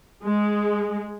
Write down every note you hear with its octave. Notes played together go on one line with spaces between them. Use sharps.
G#3